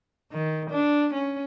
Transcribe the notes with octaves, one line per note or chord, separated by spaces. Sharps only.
D#3
D4
C#4